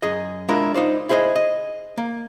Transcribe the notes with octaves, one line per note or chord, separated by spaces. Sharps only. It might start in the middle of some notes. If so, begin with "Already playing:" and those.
F#2 G#4 D#5
G#3 D4 E4 F4 A#4
D#4 F4 C5 D5
E4 G#4 C5 D5 D#5
D#5
A#3